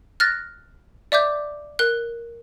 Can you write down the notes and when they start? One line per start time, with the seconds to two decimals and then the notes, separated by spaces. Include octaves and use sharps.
0.20 F6 F#6 A6 A#6
1.12 D5 E5 D6 G6
1.79 A#4 F#6